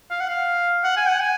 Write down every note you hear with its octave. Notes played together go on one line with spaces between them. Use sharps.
F5
F#5
F5
F#5
G#5
F#5
G#5